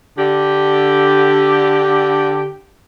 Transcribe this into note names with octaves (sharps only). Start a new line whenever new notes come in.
D3 G4